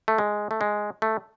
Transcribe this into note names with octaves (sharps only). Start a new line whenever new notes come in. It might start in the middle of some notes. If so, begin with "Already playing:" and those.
A3
G#3
A3
G#3
A3